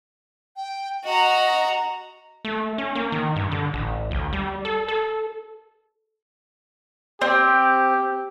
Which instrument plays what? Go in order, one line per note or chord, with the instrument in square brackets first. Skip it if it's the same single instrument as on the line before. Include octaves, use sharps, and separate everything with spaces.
[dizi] G5
[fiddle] F#4 A#5 [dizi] D#5
[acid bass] A3
C#4
A#3
D#3
G2
D3
A1
D2
G3
A4
A4
[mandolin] C4 [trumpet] G4